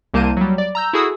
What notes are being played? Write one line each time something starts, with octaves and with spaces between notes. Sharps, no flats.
C2 A#3 A5 G6 D#7
F#3 G3
D5
A#5 E6 G6
E4 F#4 G#4 A4 D#6 E6